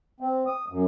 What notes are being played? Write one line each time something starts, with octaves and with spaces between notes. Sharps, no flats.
C4
D#6
F#2